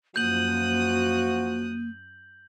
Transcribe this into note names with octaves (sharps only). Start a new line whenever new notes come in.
F#2 F3 A#3 F#4 D#6 F#6 G6 F#7